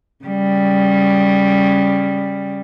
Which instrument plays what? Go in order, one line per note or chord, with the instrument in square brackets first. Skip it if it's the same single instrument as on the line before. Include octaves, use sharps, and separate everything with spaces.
[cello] C#3 G3